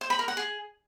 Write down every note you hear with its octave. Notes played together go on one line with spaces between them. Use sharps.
C5
B5
A#4
F#5
G#4